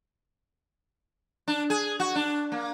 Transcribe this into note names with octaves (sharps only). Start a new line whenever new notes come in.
D4
G#4
F#4
D4
A#3